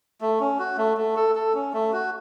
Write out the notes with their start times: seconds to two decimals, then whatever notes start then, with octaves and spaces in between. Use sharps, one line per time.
0.21 A3
0.40 C#4
0.59 F#4
0.77 A3
0.97 A3
1.16 A4
1.35 A4
1.54 C#4
1.73 A3
1.93 F#4